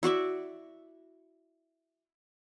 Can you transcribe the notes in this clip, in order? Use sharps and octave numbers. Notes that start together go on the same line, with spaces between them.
E4 F#4 D5 E5